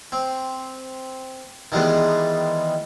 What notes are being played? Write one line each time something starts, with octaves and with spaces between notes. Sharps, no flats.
C4
D#3 E3 G3 G#3 B3